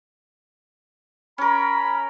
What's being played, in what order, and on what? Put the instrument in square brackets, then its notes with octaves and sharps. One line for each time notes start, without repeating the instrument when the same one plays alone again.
[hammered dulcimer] C#4 A#4 [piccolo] B5